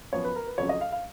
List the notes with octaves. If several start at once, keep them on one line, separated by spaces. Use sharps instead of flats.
F#2 F3 B3 C#5
B4
A#4
B4
F2 C#3 F#3 C#4 C#5
D#5
F5
F5